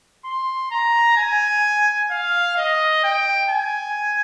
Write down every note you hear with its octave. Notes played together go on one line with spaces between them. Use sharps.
C6
A#5
G#5
F5
D#5
G5
G#5